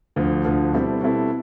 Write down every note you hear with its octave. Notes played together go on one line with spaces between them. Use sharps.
D2 D3 F3
D2 D3 F3
B2 G3 C4 E4 A4
B2 G3 C4 E4 A4